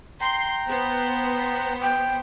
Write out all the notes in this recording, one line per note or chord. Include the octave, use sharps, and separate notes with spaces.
G5 A#5 C6
B3 C5
G5